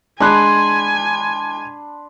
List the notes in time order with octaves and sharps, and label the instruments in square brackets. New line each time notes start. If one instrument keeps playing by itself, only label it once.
[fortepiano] G#3 F#6 [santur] D4 B5 C6 [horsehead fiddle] G#5